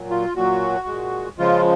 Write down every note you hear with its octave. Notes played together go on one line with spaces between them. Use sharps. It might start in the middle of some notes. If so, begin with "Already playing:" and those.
Already playing: A#2 F#3
F4
A#2 F#3 F#4
A#2 G#3
C#3 F3 G#3 F4